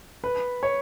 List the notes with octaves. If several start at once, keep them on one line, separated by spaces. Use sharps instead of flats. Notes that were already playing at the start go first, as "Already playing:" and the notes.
B4
C#5